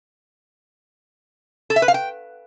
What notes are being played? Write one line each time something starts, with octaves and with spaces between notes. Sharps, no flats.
A4
E5
B4
F5
G5